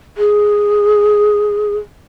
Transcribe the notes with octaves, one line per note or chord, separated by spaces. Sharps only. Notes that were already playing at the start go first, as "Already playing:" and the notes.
G#4